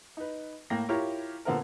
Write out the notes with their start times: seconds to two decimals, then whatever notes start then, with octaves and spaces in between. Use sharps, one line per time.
0.17 D#4 B4
0.70 A2 A#3 G5 A#6
0.89 E4 F4 G4 A#4 C#5
1.45 A#2 D3 B3 C4 A#4